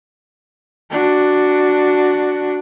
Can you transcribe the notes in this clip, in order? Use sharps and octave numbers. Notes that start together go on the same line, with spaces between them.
D4 F#4